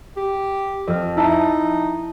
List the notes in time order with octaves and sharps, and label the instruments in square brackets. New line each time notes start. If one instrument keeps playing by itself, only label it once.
[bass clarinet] G4
[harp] F2 F6
[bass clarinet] D#4 [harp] E4 A5